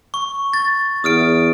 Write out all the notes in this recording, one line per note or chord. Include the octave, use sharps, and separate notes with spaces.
C#6
A6
E2 D#6 F6 D7